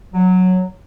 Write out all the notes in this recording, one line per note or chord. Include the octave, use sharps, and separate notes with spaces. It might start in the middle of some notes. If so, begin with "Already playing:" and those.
F#3